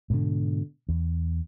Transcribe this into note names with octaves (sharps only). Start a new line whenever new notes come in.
G#2 B2 D3
E2